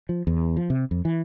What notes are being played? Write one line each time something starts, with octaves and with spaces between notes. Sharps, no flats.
F3
E2
F3
C3
F2
E3